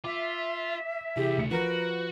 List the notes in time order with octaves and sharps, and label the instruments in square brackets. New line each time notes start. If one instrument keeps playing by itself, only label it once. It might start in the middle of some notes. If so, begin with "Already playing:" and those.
[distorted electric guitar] F4 [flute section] E5 [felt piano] D6
[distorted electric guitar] C2 [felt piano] E3 G#4 [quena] G4
[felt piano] D2 C#7
[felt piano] F3 [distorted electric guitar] F#4 [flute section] A#4 [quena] B4